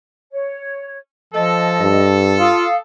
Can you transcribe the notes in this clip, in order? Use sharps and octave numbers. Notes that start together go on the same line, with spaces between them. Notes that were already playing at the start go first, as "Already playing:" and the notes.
C#5
F3 A4 D#5
G2
F4 F5 D#6